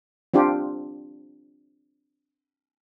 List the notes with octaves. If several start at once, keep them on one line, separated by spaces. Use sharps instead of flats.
C4 D4 F4 G4